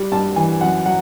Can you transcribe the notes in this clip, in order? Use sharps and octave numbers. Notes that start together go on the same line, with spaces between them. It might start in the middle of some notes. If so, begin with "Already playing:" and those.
Already playing: G3
G2 A5
E3 G#5
F#2 F#5
F#3 F#5